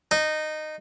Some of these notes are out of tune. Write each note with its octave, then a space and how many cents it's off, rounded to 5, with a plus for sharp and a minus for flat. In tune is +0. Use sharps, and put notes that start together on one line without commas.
D#4 -15